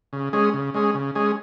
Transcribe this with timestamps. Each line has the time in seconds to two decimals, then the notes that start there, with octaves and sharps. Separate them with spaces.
0.13 C#3
0.33 G#3 C#4 G#4
0.54 C#3
0.74 G#3 C#4 G#4
0.94 C#3
1.15 G#3 C#4 G#4